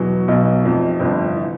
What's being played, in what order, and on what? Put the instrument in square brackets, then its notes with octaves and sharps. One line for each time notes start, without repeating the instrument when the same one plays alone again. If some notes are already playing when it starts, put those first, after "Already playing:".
Already playing: [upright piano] E2 B2 F#3
B1 B2 F#3 D#4
F1 F2 C3 F3
G1 F2 C3 F3
E3